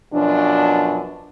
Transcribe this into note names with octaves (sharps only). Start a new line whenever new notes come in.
F#2 B2 F3 D4